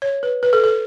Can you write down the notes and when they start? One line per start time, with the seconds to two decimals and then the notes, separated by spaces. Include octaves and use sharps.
0.02 C#5
0.23 B4
0.43 B4
0.53 A4
0.64 A4